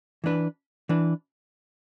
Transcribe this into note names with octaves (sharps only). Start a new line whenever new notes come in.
E3 D4 B4
E3 D4 B4